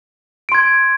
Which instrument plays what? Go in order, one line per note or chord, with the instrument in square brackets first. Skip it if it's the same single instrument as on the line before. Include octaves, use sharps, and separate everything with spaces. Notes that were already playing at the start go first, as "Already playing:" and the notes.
[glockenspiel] D7
C6
G#6